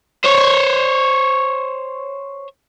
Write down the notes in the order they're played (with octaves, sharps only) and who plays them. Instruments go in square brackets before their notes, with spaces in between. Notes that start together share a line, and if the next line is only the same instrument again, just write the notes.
[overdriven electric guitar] C5 C#5